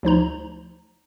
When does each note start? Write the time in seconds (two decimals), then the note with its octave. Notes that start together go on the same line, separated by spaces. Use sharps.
0.03 D2 F3 D#4 A#5